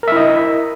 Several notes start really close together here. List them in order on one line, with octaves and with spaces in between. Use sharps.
A#4 E5 E4 D#5